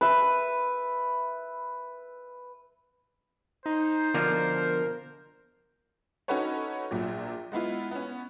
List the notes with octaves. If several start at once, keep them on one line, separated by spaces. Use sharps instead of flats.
B4 E5
D#4 C5
B2 D3 F3 A#4
C#4 D#4 F#4 A4 B4 C#5
A#1 A#2 F#3
G#3 B3 E4 F4
B3 C#4